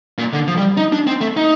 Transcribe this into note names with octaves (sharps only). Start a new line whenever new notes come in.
A#2
D3
F3
G3
D#4
D4
C4
A3
D#4